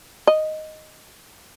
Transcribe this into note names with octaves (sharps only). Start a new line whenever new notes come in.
D#5